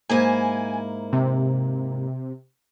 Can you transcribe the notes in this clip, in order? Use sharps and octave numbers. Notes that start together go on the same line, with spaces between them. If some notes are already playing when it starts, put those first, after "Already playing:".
G#2 A#3 E4 G#5
C3